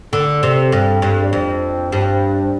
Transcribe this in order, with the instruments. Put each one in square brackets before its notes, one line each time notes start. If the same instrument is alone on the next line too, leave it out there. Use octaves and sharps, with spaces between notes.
[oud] D3 [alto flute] A4
[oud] C3
G2
G2
[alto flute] D5
[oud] F2 [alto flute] C5
[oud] G2